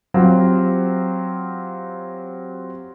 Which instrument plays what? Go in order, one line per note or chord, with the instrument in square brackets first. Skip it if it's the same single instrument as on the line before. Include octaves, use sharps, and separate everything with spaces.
[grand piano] F#3 C4 F4 G4